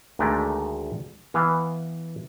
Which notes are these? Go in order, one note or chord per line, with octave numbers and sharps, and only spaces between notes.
D2 D#3 G#3 A3 D5
E3 B3 F5 G#5